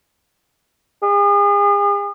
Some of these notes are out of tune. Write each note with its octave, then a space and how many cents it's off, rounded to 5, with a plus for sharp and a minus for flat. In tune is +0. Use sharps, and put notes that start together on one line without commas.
G#4 -40